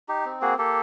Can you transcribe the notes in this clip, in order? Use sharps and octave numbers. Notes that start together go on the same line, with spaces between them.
D#4 G4
C4
A#3 F#4 G#4
A#3 G4 A4